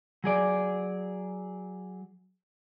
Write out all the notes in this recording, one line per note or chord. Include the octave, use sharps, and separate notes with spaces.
F#3 G#4 D5